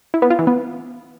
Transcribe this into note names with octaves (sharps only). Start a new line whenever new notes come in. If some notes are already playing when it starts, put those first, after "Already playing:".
E4
B3
F4
E3
B3